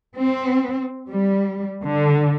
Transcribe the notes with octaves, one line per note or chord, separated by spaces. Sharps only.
C4
G3
D3